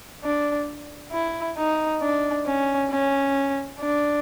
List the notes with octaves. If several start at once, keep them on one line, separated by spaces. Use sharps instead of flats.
D4
E4
D#4
D4
C#4
C#4
D4